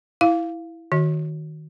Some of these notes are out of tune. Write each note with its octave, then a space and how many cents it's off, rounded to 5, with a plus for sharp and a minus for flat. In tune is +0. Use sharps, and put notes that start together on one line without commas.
E4 +0 F5 -5
D#3 +0 F#4 +0 D#5 +40